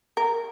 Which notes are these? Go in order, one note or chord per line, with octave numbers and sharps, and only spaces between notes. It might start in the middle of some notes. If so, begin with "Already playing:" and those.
A#4